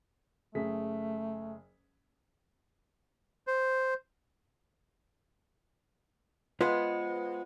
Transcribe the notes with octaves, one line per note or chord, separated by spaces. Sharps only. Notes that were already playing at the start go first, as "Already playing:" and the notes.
F#1 A3 G#4 B6
C5
G#3 B3 F4 B4 C5